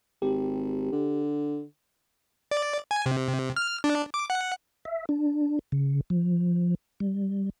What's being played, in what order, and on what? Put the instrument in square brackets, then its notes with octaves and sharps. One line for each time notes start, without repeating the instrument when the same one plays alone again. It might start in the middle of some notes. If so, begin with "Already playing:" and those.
[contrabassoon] G#1 [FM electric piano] G4
[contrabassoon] D3
[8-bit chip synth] D5
G#5
C3
F6
D4
D6
F#5
[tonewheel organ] E5
D4
C#3
F3
G3